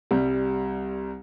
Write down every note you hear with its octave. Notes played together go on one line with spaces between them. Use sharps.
C2 G3